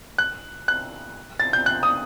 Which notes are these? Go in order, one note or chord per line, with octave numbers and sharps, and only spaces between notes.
F#6
F#6
A6
G6
F#6
D#6